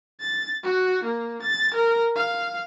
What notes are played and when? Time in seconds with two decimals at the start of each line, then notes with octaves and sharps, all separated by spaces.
0.20 A6
0.63 F#4
1.04 A#3
1.42 A6
1.74 A#4
2.16 F5